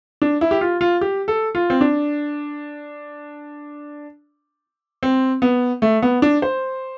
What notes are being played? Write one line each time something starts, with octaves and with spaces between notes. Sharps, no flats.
D4
E4
G4
F4
F4
G4
A4
F4
C4
D4
C4
B3
A3
B3
D4
C5